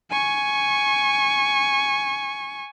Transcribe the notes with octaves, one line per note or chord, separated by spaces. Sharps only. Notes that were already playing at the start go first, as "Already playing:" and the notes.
G#5 C#6